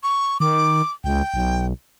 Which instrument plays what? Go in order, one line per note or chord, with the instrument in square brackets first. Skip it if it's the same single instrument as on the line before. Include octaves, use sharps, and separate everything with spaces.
[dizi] C#6
[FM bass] D#3 [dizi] D6
[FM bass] C#2 [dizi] G5
[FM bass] B1